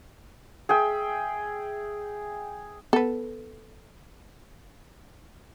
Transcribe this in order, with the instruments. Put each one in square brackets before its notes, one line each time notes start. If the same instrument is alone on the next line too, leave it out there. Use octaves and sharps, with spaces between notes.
[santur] G#4 E5 G5
[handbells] B3 [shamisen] A4 B4